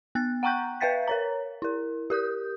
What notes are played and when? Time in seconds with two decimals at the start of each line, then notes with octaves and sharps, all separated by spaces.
0.15 B3 F#6 A6
0.43 F#5 G5 A#5 C#6 F#6 G6
0.81 B4 E5 F5 G5 A6 B6
1.08 A#4 C#5 A#5
1.62 E4 A#4
2.10 G4 A#4 D#6 G6